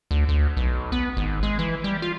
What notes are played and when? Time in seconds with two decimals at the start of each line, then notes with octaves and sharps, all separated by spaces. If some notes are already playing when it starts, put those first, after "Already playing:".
0.11 D2
0.29 D2
0.57 B1
0.92 B3
1.17 G#1
1.43 G#3
1.59 E3
1.84 G3
2.02 F4